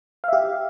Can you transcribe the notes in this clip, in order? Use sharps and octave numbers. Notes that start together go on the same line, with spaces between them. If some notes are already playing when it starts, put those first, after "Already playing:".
G4 E5 F5